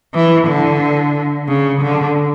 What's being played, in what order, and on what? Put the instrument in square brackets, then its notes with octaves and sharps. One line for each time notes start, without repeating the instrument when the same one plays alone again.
[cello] E3
D3
C#3
D3